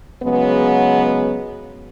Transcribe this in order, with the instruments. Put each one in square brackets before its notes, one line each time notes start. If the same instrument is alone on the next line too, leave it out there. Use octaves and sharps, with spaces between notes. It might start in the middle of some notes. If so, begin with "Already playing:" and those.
[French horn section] C#3 F#3 G#3 B3